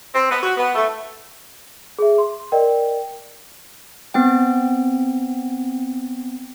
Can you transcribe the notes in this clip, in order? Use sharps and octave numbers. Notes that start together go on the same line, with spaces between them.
C4
B3
F#4
B3
A3
G#4 E5
C6
A#4 D5 D#5 G5
B3 C4 G5